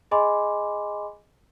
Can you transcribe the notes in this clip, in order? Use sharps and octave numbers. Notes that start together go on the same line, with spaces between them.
G#4 D#5 G#5 B5 C6 D6